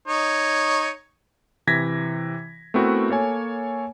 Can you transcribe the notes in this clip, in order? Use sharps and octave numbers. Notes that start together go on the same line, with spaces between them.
D#4 C#5
C3 E3 G#6 A#6 B6
A3 B3 C4 E4 F#4 A#4
A#3 A4 C#5 G#5